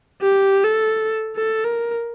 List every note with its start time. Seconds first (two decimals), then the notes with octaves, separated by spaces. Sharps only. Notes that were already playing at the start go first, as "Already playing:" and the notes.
0.22 G4
0.65 A4
1.36 A4
1.64 A#4